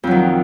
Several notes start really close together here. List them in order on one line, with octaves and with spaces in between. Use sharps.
F2 F#3 D#3